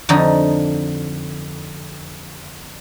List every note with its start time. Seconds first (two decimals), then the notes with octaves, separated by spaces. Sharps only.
0.09 F2 D3 D#4